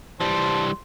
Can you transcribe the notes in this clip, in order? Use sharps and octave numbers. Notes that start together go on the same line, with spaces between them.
E3 G3 C5 A5 C6